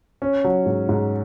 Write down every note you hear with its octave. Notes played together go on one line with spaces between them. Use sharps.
C#4
F#3
G#2
G#2